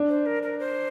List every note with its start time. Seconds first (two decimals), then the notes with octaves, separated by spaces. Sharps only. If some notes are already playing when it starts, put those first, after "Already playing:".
Already playing: D4
0.09 C5
0.26 A#4
0.43 A#4
0.59 C5